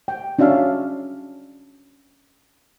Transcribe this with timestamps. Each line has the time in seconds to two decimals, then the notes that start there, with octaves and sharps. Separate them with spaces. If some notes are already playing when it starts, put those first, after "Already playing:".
0.08 G5
0.39 C#4 D4 F#4 E5 F5 A5